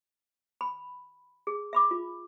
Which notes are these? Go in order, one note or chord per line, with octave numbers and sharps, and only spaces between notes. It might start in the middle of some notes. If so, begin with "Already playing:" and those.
B5
G#4
E5 B5 D6
F4